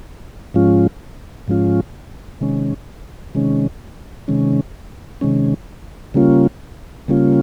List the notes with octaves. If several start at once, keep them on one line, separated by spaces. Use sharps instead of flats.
G#2 F3 G#3 C#4 F4
G#2 F3 G#3 C#4 F4
C3 D#3 G#3 C#4
C3 D#3 G#3 C#4
C3 D#3 G#3 C#4
C3 D#3 G#3 C#4
C#3 G3 A#3 C#4 F4
C#3 G3 A#3 C#4 F4